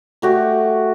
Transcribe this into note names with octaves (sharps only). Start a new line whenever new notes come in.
A3 F#4 G4